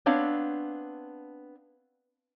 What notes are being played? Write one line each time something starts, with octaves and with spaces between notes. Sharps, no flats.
B3 C4 D4 C#5 F5